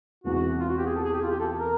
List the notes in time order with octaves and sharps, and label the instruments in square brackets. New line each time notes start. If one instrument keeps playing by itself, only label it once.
[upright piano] E1 E2 C3 [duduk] F#4
[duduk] F4
F#4
G4
G#4
A4
G#4
G4
F4
G4
A4
A#4